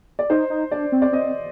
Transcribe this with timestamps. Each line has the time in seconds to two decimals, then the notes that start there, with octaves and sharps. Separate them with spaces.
0.19 D5
0.30 D#4 C5
0.50 D#4
0.71 D4 D5
0.92 C4
1.02 D5
1.12 C4 D#5